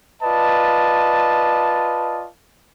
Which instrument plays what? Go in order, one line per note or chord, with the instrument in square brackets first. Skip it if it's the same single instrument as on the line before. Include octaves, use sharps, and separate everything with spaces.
[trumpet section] F4 B4 D5 D#5 A5